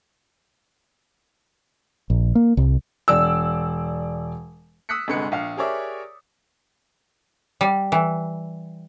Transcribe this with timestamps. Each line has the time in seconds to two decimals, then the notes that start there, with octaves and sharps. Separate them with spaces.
2.10 A#1
2.35 A#3
2.57 C2
3.08 E1 D5 E6
4.89 D#6 E6 F#6 B6 C#7
5.08 G1 D2 C3 G#3 B4 C#7
5.32 A#1 F5
5.57 G4 G#4 A#4 C#5 D5 E5
7.61 G3
7.92 E3